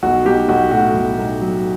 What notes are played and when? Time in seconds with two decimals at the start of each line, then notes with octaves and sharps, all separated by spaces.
0.03 B1 F#4
0.25 B1 G4
0.49 B1 F#4
0.71 A2 F#4
0.95 B1
1.18 B1
1.41 F#3